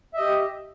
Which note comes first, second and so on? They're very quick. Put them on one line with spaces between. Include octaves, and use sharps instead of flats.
E5 D#5 G4